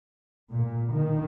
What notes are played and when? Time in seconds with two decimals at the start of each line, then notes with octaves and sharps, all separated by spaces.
0.53 A#2
0.93 D#3